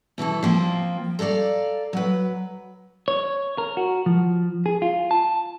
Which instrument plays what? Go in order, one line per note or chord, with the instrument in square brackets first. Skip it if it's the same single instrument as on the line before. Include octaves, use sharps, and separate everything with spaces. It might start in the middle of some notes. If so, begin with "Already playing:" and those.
[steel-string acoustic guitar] B2 E3 E4 A4
F3 A#3 C4
A4 A#4 C#5 D5 F5
F#3 B4
[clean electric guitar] C#5
A#4
F#4
F3
G#4
F4
A5